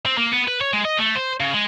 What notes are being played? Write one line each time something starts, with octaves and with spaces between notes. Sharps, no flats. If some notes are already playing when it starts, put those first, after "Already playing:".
C4
A#3
B3
B4
C#5
G#3
D#5
A3
C5
C#3
G#3